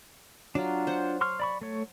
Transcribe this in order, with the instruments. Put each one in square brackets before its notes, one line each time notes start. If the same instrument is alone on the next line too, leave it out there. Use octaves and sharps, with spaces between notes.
[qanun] F#3 [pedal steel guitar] D4 F4
[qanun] C5 F#5
[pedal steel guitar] C6 C#6 F6
D5 B5 C#6
A3 C#5